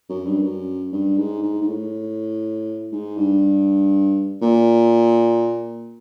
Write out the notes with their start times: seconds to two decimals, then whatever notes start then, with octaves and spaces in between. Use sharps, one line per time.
0.09 F#2
0.26 G2
0.42 F#2
0.92 G2
1.17 G#2
1.43 G#2
1.62 G#2
1.67 A2
2.92 G#2
3.17 G2
4.42 A#2